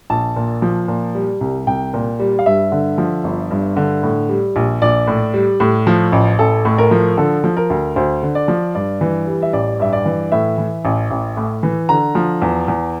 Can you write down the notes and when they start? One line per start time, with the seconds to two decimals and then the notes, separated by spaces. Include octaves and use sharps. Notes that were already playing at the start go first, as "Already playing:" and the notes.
0.10 A#1 A5
0.36 A#2
0.62 F3
0.88 A#2
1.15 G3
1.41 C2
1.67 C2 G5
1.94 A#2
2.20 G3
2.39 F5
2.46 G2 E5
2.72 D3
2.98 F3
3.24 G1
3.51 G2
3.77 D3
4.03 A2
4.29 G3
4.56 A#1
4.82 A#1 D5
5.07 A2
5.34 G3
5.60 A2
5.87 F3
6.12 A1
6.39 A1 A4
6.65 A2
6.78 A#4
6.91 F3
7.17 D3 A4
7.44 F3
7.57 A#4
7.70 D2
7.96 D2 C5
8.23 D3
8.35 D5
8.48 F3
8.75 G2 D5
9.01 E3
9.27 G3
9.43 E5
9.53 A1 D5
9.79 G2 E5
9.93 D5
10.06 E3
10.32 A2 E5
10.58 E3
10.85 A1
11.11 A1
11.37 A2
11.63 E3
11.89 D3 A#5
12.15 F3
12.42 E2
12.68 E2